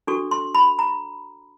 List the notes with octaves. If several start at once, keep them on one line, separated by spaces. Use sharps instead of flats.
D4 F#4 A4 C#6
C6
B5
A#5